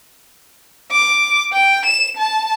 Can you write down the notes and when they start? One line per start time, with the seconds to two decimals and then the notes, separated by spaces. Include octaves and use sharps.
0.92 D6
1.53 G5
1.86 E7
2.17 A5